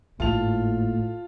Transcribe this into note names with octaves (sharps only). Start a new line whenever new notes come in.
G#1 A2 A#3 F4 A5 F7